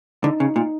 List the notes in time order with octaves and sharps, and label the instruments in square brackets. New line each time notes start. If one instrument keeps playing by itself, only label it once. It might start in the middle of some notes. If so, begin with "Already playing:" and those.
[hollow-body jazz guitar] D3 [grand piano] D#4
[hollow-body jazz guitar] C#3
[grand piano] D#4
[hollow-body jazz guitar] A#2